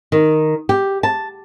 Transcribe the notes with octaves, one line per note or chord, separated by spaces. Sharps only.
D#3
G4
A5